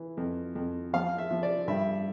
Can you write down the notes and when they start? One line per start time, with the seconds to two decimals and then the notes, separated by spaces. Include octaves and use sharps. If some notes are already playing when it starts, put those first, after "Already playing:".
Already playing: E3
0.17 F2
0.55 F2
0.93 F3 F5
1.18 E5
1.31 F3
1.43 D5
1.68 G2 E5